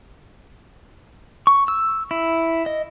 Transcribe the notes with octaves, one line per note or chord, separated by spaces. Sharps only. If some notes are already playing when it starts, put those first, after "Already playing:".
C#6
E6
E4
D#5